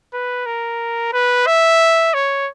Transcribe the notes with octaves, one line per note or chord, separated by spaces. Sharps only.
B4
A#4
B4
E5
C#5